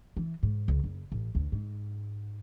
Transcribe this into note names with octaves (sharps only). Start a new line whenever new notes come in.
E3
G#2
C#2
F#1
A1
D2
G#2